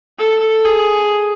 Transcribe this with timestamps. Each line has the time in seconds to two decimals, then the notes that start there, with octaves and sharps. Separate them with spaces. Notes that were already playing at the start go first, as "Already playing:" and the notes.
0.18 A4
0.65 G#4